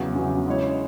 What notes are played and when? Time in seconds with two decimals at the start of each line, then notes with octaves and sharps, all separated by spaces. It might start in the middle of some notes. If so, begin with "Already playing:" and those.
Already playing: E2 C#3 F#3
0.14 E2 C#3 F#3
0.46 C#3 G#3 E4 C#5